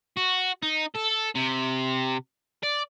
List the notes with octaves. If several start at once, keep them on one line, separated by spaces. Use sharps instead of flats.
F#4
D#4
A4
C3
D5